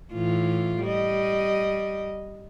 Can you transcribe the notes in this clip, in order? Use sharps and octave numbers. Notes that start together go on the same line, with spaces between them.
A2 E3 F4
G3 D#5